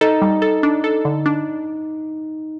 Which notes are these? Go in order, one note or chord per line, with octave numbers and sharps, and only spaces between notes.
D#4 A4
G3
A4
D4
A4
D3
D4